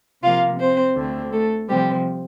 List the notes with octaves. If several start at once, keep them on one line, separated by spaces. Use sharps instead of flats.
C3 F3 A#3 F4 F5
C4 C5
D2 D3 A3 C4
A3 A4
C3 F3 G3 C4 G4